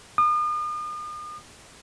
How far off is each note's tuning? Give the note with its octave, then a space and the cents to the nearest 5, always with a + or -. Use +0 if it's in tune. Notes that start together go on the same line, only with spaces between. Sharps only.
D#6 -40